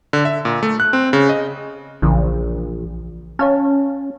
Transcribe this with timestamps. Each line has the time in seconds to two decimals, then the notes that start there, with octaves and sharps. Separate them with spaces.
0.13 D3
0.25 E5
0.45 A#2
0.63 A3
0.80 F#6
0.93 C4
1.13 C#3
1.29 D#5
2.02 A#1 C#3 E3
3.39 C#4 C#5 F5 A5